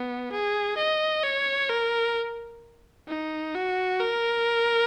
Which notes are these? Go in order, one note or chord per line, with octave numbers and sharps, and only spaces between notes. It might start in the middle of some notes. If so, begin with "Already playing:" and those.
Already playing: B3
G#4
D#5
C#5
A#4
D#4
F#4
A#4